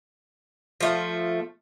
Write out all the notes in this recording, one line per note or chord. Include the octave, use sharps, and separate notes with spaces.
F3 A3